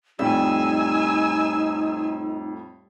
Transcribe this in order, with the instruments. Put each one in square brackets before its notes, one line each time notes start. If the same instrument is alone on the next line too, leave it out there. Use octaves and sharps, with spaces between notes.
[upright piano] F2 A2 [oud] G3 [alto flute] D#4 [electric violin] G#5 E6